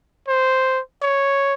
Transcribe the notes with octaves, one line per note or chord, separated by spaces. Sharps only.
C5
C#5